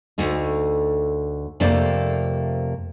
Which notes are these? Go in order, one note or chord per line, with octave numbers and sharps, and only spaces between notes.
D2 A3 D#4
F2 C3 A3 A#3 C5 D5